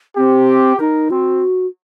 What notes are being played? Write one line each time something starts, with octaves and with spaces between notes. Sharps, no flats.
C4 G4
D#4 A#4
C4 F#4